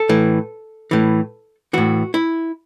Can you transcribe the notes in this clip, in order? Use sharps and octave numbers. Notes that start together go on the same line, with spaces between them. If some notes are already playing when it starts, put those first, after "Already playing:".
Already playing: A4
A2 E3
A2 E3
A2 E3 F#4
E4